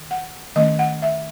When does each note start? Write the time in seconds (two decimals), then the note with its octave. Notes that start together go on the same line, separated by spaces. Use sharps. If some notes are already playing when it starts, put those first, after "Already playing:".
Already playing: D#3
0.11 F#5
0.56 D#3 A3 C#4 D#5
0.79 F#5
1.02 E5